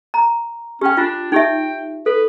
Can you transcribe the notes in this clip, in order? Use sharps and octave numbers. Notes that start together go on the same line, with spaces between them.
A#5
C#4 G4 G5
D4 F4
D#4 G4 E5 G5
A4 B4